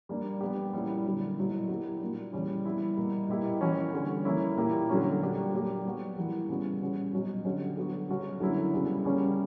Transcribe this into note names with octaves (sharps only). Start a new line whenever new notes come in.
G3 A#3 D4
G3 B3 D4 G4
A#2 G3 A#3 C#4 E4
D3 F#3 B3 D4
B2 F#3 A#3 E4
F#3 A#3 E4 G4
A#2 A#3 D4
C#3 E3 G3 C#4
G3 B3 E4
B2 G3 A#3
B2 A#3 E4 G4
E3 A#3 C#4 F#4
D3 G3 C#4
E3 A#3 C#4 E4
A#2 A#3 E4 G4
D3 F#3 C#4
A#2 G3 A#3 D4 G4
F#3 A#3 D4 G4
F#3 B3 F#4
E3 G3 A#3 E4
C#3 G3 B3 F#4
C#3 G3 C#4 F#4
B2 F#3 C#4 F#4
D3 F#3 C#4 G4
D3 F#3 B3 F#4
C#3 F#3 C#4 F#4
D3 F#3 A#3 C#4 E4
C#3 G3 B3 D4
C#3 G3 A#3 C#4 G4